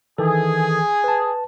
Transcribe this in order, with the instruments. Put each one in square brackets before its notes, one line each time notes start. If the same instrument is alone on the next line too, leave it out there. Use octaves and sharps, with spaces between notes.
[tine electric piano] D#3 E3 A4 [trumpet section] G#4
[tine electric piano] B4 A5